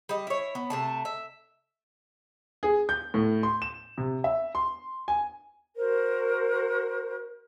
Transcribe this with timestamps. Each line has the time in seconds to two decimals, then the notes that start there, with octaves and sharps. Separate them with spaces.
0.09 G3 D#5
0.27 E4 C#5
0.55 B3
0.70 C3 A3 A5
1.05 E5
2.63 G#4
2.89 G6
3.14 A2
3.43 C6
3.62 E7
3.98 C3
4.24 E5
4.55 C6
5.08 G#5
5.77 F#4 A#4 C5